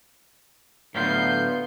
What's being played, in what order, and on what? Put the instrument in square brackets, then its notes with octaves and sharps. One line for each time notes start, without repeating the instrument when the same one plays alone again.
[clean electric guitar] A2 F#3 F4 [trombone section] D3 A3 B3 [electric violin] G6 C7